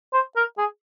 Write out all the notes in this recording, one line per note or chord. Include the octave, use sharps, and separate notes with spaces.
C5
A#4
G#4